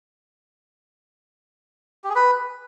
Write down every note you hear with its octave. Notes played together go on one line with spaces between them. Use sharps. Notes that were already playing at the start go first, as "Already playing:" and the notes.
G4
G#4
B4